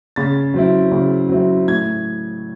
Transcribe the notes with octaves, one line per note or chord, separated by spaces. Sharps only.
C#3 A6
F#3 C4 E4
C#3
F#3 C4 E4
A2 G#6